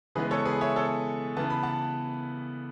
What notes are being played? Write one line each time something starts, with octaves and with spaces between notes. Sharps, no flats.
C#3 E3 G#3 B3 G#4 B4
A4 C#5
G#4 B4
C#5 E5
A4 C#5
C#3 E3 B3 A5
B5
F#5 A5